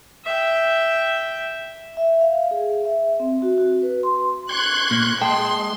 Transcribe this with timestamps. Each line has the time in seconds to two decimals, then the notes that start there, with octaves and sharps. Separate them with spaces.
0.25 E5 G5
1.97 E5
2.21 F5
2.51 G#4
2.85 E5
3.20 C4
3.42 F#4
3.58 F#4
3.82 B4
4.03 C6
4.49 C6 C#6 F#6 G#6
4.91 A#2
5.21 G#3 G5 A5 C6